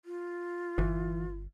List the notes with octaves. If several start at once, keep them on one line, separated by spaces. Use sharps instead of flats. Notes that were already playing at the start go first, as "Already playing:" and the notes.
F4
G1 E3